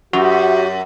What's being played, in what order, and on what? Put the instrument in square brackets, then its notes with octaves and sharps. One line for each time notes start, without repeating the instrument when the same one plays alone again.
[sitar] F#2 [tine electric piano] F#4 [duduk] G4